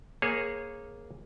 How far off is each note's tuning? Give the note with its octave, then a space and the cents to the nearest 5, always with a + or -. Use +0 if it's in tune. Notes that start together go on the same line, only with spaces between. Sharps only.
A#3 +0 G#4 +0 C#5 -25